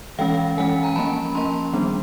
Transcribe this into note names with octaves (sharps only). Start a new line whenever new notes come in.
E3 G#3 C#4 F5 G5
E3 G#3 C#4 F#5 G#5
G#5 A#5
F3 A#3 C#4 A5 B5
F3 A#3 C#4 A#5 C6
D#3 G3 B3 D4